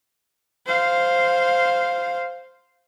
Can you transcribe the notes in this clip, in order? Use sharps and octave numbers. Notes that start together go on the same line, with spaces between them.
C5 F5